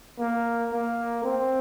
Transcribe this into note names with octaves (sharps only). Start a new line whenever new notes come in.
A#3
A#3
C4